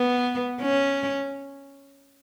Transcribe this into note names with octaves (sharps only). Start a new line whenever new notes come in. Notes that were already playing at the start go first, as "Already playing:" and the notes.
Already playing: B3
C#4